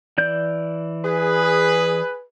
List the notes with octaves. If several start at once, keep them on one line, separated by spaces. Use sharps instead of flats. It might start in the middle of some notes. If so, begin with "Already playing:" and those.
E3 D5 G6
G#4 B4